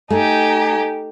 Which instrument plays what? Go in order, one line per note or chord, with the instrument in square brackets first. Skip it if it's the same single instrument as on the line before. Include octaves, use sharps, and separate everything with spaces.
[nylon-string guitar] A3 [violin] D#4 G4 [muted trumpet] G#5